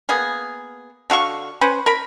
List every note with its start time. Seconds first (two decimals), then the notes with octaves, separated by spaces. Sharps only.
0.09 A#3 B3 G#4
1.10 D3 F#4 F5 C#6
1.61 C#4 B4 C5
1.86 A#4 B5